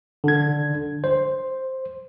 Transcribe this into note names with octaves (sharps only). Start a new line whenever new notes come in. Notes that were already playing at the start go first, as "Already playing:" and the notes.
D3 G#6
C5